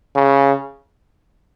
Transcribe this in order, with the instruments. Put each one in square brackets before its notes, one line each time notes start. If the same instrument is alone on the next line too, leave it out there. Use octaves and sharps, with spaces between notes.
[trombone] C#3